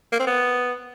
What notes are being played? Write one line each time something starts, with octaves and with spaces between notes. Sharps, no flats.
A#3
C4
B3